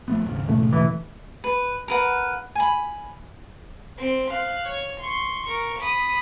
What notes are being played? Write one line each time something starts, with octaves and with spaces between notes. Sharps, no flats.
F3 A3 B3
D#2 G#2 C#3
E2 B2 A3
E3
B4
A#4 B4 F#5
G#5 B5
C4 D7
F5 F#6
C#5
C6 C#6
A#4 C#6
B5 D#6